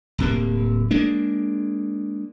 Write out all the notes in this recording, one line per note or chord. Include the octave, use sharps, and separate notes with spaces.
D1 C3 A#3
G#3 A#3 D4